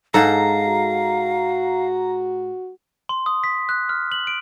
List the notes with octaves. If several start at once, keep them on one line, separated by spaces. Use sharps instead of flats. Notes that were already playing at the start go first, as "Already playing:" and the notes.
G#2 A4 F5 A#5
F#4
C6
D#6
B6
F#6
F6
F#7
D7